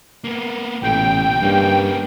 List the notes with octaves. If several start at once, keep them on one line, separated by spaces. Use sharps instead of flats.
A#3 B3
A1 A#2 B3 G5
G2 A#3 C#4